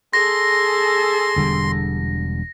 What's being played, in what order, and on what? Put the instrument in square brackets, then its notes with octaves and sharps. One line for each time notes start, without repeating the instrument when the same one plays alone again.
[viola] G#4 A4 [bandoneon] C6 [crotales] A#6
[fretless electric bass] E1 D3 G3